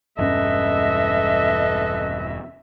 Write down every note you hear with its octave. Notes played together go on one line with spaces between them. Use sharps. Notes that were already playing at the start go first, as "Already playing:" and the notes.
E1 G2 C#4 A4 B4 D#5 E5